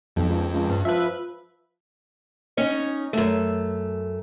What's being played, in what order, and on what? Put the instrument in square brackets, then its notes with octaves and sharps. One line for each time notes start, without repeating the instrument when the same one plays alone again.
[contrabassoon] B1 [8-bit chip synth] F2
[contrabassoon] C#2
C#2
[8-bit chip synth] G2
[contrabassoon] F3 [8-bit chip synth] B4 E5
[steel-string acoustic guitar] C#4 D#4 C#5
F#2 A3